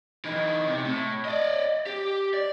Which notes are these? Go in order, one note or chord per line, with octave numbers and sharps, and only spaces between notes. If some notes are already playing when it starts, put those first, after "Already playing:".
E3 D#4
C3
A2
D5 D#5
G4
D5